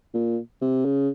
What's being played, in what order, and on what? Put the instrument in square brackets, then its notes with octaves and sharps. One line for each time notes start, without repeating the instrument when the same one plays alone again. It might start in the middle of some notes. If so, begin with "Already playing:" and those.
[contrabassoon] A#2
C3
C#3